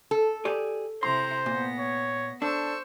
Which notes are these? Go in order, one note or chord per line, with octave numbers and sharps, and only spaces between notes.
A4
G4 G#4 D5
C3 E4 C5 A#5 C6
A#2 B3 A#6
C#5
D4 A4 C5 C#6 E6